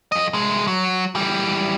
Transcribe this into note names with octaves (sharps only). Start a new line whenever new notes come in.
F2 D#5
C2 G#3
F#3
E3 G3